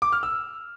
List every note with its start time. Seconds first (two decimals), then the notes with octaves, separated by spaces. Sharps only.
0.02 D6
0.12 F6
0.23 E6